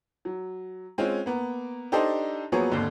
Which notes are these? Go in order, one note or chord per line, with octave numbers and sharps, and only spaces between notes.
F#3
G#3 C4 C#4 F4
A#3 B3
D4 D#4 G4 A4 C5 D#5
F3 F#3 A#3 B3 G#4 C#5
G#1 D#2 D3